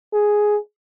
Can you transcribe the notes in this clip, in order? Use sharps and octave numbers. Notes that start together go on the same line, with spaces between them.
G#4